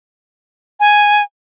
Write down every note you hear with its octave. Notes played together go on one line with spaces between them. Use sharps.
G#5